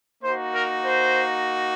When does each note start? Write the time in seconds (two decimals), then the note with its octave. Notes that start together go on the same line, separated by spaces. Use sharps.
0.23 A#3 D#4 F#4 C5
0.54 A#4
0.84 C5